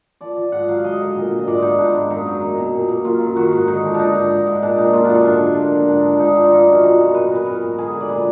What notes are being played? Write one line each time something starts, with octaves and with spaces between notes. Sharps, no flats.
F3 D5
F3
G#2 F#5
F#3 F5
G#3 D#5
D3 D#5
A#2
A#2
D#5
G#2 D5
F4
B3 D#4
G#2 D4
G#2
F#2 D#4
F#3
A#3
B2
A#2
A#3
F#2 F4
F#2
D#3 F#4
G#2
D3 D#4
F3
F3 D4 D#4
G#2
G#2
G#2
A#2 D4
A#2 D#4
F#2 F4
D4
D3
D4
G#2 D4
F3
A#3
A#3
G#2 D4
F3
G#3 D#4
G#2 D4
F4
F3 D#4
F#2 F#4
B3 G#4
B2 A#4
A#2 B4
A#2 B4
B3 A#4
G#2
D3 G#4
D3
D5
A#2 B4